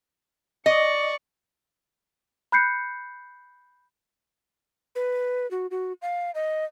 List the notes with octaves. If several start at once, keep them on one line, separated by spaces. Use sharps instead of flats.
D5 D#5 C#6
B5 F#6 G6 C7 C#7
B4
F#4
F#4
F5
D#5